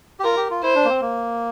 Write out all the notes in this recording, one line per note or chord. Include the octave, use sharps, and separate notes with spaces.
G4
F4 A#4
G4
F4
E4 C5
D4
A#3
C4
A#3